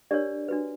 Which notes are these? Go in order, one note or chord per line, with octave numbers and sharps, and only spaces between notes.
D4 G4 A#4 C#5 D5
D4 F#4 B4